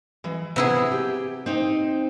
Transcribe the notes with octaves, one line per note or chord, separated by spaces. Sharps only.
E3 G#3
C3 B3 E4 G#4 F#5
G4
C4 D#4 C5